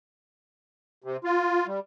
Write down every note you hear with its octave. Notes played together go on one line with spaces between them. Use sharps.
C3
F4
G3